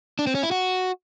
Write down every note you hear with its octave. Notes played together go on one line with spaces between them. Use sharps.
D4
C4
C#4
E4
F#4